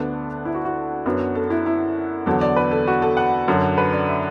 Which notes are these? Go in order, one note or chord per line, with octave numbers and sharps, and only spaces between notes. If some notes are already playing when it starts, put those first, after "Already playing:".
Already playing: D2 D3 B3 D4 A4
E4
F#4
F#4
F#2 F#3 B3 D4
A4
E4
E4
E2 D3 F#3 A4
D5
B4
A4
F#4
A4
F#5
F#2 D3 F#3
B4
D5
E5